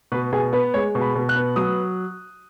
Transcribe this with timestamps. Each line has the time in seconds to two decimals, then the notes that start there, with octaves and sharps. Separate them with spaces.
0.12 B2 B4
0.33 B2 G#4
0.53 B3 B4
0.74 G#3 C#5
0.95 B2
1.01 B5
1.15 B2
1.29 F#6
1.36 B3
1.56 F#3 D#6